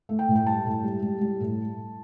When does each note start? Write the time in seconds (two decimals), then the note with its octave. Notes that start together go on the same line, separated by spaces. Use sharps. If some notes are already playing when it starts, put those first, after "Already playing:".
0.09 A3
0.19 G5
0.28 A2
0.35 G5
0.47 G3 A5
0.66 A2
0.84 G3
1.02 G3
1.21 G3
1.40 A2